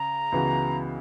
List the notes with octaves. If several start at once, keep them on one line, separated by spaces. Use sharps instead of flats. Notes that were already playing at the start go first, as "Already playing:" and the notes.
Already playing: C#3 C#4 A#5
C#2 C#3 E3 B3 F#4